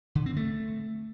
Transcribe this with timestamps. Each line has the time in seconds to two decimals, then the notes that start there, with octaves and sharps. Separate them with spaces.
0.15 D3
0.26 C4
0.36 A3